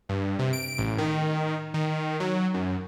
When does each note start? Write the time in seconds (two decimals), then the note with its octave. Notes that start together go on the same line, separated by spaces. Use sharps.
0.09 G2
0.39 C3
0.53 D7
0.78 A1
0.98 D#3
1.74 D#3
2.20 F#3
2.54 F#2